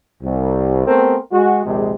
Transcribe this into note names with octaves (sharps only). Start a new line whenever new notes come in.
C2
A3 B3 C4 G#4 A#4 C5
G#3 F#4
A#1 D#2 C3 G#3